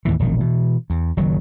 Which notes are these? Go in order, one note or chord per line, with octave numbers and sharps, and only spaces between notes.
D#2 A2 E3
E1 A#1 D#3
B2 E3
E2
F#1 D#3 F#3